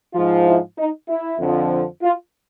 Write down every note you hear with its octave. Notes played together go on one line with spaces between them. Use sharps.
G#2 F3 F4
E4
D#4
E4
F2 D3 F3
F4